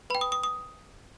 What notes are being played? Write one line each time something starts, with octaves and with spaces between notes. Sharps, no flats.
B4 G5 B5
D#6
D#6
D#6